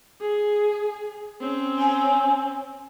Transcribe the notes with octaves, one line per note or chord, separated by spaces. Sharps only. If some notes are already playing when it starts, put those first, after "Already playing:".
G#4
C4 C#4
G#5